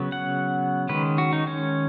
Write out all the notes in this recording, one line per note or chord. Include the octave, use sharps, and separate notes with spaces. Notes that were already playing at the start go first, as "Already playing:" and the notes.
Already playing: C#3 F#3 B3
F#5
D#3 G#3 C#4 B4
F#4
D#4
C#4